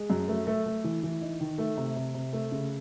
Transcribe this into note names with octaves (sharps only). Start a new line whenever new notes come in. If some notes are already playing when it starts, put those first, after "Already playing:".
Already playing: G#3
F#2
A3
A3
A3
E3
E3
D#4
D#3
A3
C3
C3
C3
A3
C#3